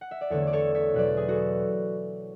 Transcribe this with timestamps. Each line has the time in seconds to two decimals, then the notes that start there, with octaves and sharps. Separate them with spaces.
0.01 F#5
0.11 E5
0.21 D5
0.30 E2 D3 A3 A4 C#5
0.47 D5
0.53 A4 C#5
0.74 C#5 E5
0.94 E2 B2 F#3 B4 D5
1.17 G#4
1.28 F#4 A4